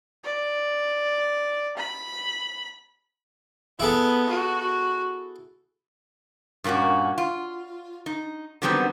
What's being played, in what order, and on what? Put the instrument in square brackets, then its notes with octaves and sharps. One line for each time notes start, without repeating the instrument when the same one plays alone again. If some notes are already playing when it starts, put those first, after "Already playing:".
[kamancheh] D5
B5
[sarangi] B3 [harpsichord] E4 G#4 A4
[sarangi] F#4
[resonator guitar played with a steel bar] G2 A#2 A#3 C#4 F#4
F4
D#4
D3 D#3 F#3 G3 B3 C4